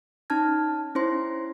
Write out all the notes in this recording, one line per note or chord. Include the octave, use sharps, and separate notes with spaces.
C#4 D#4 A5 F6 G#6
C#4 E4 C5 C6